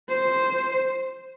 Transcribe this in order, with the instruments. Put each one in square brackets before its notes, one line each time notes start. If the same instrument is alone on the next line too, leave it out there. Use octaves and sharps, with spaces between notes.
[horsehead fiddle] C5